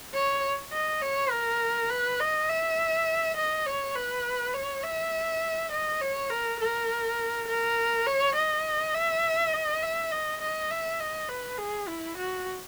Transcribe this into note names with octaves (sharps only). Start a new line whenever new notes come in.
C#5
D#5
C#5
A#4
B4
D#5
E5
D#5
C#5
B4
C#5
E5
D#5
C#5
A#4
A#4
A#4
C#5
D#5
E5
D#5
E5
D#5
D#5
E5
D#5
B4
G#4
E4
F#4